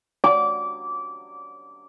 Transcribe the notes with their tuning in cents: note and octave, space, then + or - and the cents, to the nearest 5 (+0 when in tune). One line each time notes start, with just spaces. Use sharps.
D6 -20